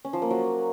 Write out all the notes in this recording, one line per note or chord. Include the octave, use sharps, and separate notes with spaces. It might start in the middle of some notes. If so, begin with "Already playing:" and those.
C#4
F3
A#3
F#3